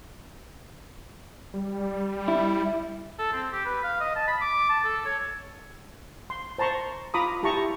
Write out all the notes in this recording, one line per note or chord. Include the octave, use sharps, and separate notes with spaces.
G3
E4
A4
C4
G4
B4
F5
D#5
A5
B5
D6
A5
A4
C#5
C6
C5 A5 A#5 C6 C#6
F4 A#5 B5 D6 D#6
E4 G4 A5 A#5 C#6